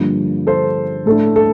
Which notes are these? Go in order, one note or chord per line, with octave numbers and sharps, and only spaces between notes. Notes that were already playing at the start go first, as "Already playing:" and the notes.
Already playing: G2 D3 F3 A#3
A4 C5
A2 A3 D4 A4
A4